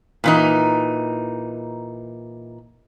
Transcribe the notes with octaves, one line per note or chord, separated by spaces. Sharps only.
A#2 E3 D#4